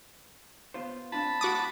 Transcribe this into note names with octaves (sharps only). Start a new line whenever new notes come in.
B3 F4 C5
C4 D4 F4 A5 B5
A2 F#4 D6 D#6